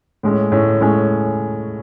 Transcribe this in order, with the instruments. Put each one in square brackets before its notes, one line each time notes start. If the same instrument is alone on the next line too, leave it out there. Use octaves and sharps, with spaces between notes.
[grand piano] A2 G#3 C#4
A2 G#3 C#4
A2 G#3 C#4